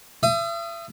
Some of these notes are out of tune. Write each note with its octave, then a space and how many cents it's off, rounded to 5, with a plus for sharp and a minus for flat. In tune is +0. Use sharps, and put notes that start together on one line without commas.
E5 +40 D#6 +0